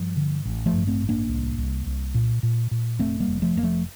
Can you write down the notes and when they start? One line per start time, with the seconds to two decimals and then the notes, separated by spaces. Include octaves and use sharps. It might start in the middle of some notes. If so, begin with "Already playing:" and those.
Already playing: G2 F3
0.17 D3
0.45 A1
0.66 F3 A3
0.73 G2
0.87 A3 C4
1.02 A1
1.09 A#3 D4
1.29 C2
1.58 C2
1.86 C2
2.14 A#2
2.43 A#2
2.71 A#2
2.99 F1 A3 C4
3.20 G3 A#3
3.28 F1
3.42 F3 A3
3.56 F1 A#3
3.63 F3 A3